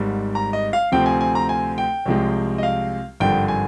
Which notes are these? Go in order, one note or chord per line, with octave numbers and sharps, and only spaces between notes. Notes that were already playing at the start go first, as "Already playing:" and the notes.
Already playing: G#1 G#2 G3
A#5
D#5
F5
D2 C3 F3 C4 G5
G#5
G#5
A#5
G#5
G5
C2 C3 F3 G#3
D#5
F5
G#1 G2 D3 F3 G5
G#5